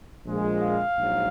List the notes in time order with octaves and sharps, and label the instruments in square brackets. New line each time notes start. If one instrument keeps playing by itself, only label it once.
[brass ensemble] A#1 A#2 F3 G#3
F5
A#1 G#2 F#3